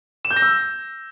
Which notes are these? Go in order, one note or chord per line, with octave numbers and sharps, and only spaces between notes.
E7
G6
A#6
E6